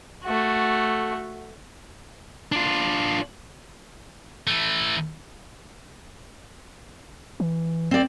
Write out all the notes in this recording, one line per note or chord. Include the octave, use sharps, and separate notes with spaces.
A3 F#4
D4 F4
E3 A3
E3
C4 D5